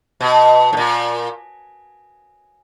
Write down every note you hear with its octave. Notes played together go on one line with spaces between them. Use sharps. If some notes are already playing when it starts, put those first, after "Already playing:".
B2
A2
A#2